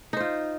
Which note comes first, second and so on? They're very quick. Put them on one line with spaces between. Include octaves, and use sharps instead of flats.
D#4 C5 F4